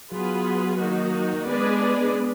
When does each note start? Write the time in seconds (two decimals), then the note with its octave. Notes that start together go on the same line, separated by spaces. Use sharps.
0.12 F#3 B3 F4 G#4 B4
0.79 D#3 A#3 D#4 F#4
1.47 G#3 B3 D4 G#4 B4 D5
2.15 B3